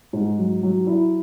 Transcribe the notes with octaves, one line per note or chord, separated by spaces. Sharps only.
G#2
F#3
F#3
E4